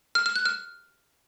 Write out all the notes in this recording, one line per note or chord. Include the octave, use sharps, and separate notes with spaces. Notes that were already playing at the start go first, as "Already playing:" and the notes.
F6
F6
F#6
F6